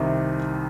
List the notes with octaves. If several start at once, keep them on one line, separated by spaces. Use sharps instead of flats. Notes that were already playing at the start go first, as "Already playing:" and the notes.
Already playing: C2 C3 D#3